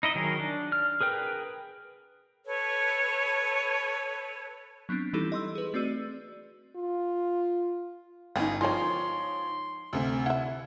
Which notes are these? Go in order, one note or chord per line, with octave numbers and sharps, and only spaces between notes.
D#4 E4 D#5
D#3 F#3 G#4 A#4
D4
F6
G#4 A#4 B4 G5
A4 B4 C#5
F#3 B3 C4 D4
E3 G3 D#4 E4 G4 A4
D#5 C6 E6
G#4 B4
A3 C4 F#4 D5 E6 D#7
F4
G1 C#4 D#4 F4 G5
D#3 F3 G#3 D#4 C#5 C6
D2 C3
E4 E5 F#5